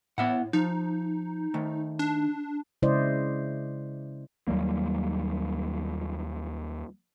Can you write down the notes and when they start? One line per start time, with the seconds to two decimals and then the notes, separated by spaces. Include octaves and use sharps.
0.18 A2 B3 E5 F#5
0.53 F3 D#4
1.54 D#3 A3
1.99 D4
2.82 C#3 G#3 E4 C5 D5 D#5
4.48 D#2 F#3 G3 A#3